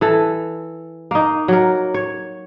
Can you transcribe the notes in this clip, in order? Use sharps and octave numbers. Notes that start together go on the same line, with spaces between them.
E3 A4
A#3 D#4
F#3 A#4
C#5